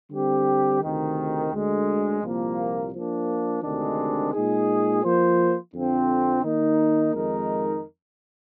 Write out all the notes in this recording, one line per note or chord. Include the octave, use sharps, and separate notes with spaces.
D3 G3 C4 G4
D2 C3 D#3
D2 D3 G#3
C2 A#2 F3 A#3
F3 A#3 D4
D2 C3 D#3 G#3 D4
A#2 G#3 D#4 G#4
F3 A#3 F4 C5
F2 D3 F3 C4
D#3 A#3 D#4
F2 D#3 G#3 D#4 A#4